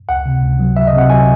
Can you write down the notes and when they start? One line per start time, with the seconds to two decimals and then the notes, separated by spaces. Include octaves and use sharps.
0.09 C#2 F#5
0.26 C3
0.43 C#2
0.59 F#3
0.76 F#3 E5
0.87 D#5
0.93 C3
0.98 F#5
1.10 F#3 G#5